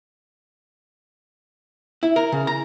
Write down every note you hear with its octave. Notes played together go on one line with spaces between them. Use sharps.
E4
A#4
C#3
A#5